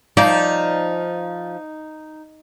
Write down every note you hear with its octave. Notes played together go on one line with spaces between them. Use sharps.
F3 D#4 D5